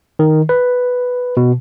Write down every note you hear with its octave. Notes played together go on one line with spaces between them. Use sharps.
D#3
B4
B2